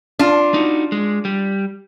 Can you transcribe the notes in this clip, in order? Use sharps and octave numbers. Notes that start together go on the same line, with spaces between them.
D4 F4
D#4 F#4
G#3
G3